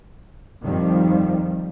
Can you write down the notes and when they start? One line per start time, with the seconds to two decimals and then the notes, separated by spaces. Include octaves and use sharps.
0.63 F2 D#3 F3 G3